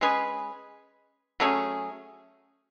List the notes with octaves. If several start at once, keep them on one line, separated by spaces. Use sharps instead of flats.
G#3 C#4 G#4 B4
F#3 A3 C#4 G#4